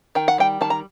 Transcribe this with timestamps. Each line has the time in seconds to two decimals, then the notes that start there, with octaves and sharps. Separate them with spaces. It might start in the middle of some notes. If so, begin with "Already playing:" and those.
0.15 D#3 G5
0.28 F#5
0.38 G3 G5
0.61 D#3 A5
0.70 A#5